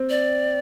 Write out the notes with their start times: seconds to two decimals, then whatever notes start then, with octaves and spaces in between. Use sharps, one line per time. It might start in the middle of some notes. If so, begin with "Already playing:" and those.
Already playing: C4
0.10 D5